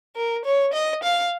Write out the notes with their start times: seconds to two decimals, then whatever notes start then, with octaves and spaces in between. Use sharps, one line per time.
0.16 A#4
0.45 C#5
0.73 D#5
1.03 F5